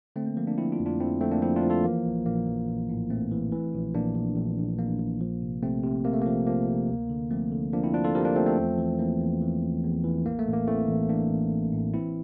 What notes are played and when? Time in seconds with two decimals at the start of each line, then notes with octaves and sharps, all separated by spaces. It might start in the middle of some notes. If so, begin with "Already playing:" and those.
0.16 D3 A3 C4
0.26 A#3
0.37 F3 A#3
0.47 A#3 D4
0.58 F3 C4 E4
0.72 D4 F4
0.79 F2
0.86 D4 F4
1.00 F2 C4 E4
1.21 F3 A3 C4
1.31 A#3 D4
1.42 F3 C4 E4
1.56 D4 F4
1.63 F3
1.70 F4 A4
1.84 E3 A#3
2.05 A#1
2.26 A#1 A#3
2.47 A#1
2.68 A#1
2.89 A2
3.10 A#1 A3 C4
3.31 E3
3.52 E3
3.74 A#1
3.94 A#1 A#3 D4
4.16 A#1
4.36 A#1
4.58 A#1
4.79 A#1 A#3
5.00 A#1
5.21 F3
5.42 C3
5.63 C3 A3 C4
5.83 C3
6.05 C3 A#3
6.13 A3
6.22 F3 A#3
6.47 F3 A#3
6.68 C3
6.89 D2
7.10 D3
7.31 F3 A3 C4
7.52 D3
7.73 F3 A#3 D4
7.83 C4 E4
7.94 F3 D4 F4
8.04 F4 A4
8.15 F3 G4 A#4
8.25 A#3 D4
8.36 F3 A3 C4
8.46 A3 C4
8.58 E2
8.78 E3
8.99 E3 A#3
9.20 E2
9.42 E3
9.62 E2
9.84 E2
10.04 E3
10.25 A1 A#3
10.39 A3
10.46 A1
10.53 A#3
10.67 E3 A3 C4
10.88 A1
11.09 E3 A#3 D4
11.30 A1
11.51 A1
11.72 A2
11.94 E3 C4 E4